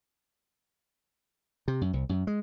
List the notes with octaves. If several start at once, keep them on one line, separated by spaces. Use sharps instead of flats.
C3
F#2
C2
F#2
G#3